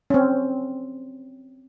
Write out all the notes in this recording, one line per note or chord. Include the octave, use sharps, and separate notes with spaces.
C4 C#4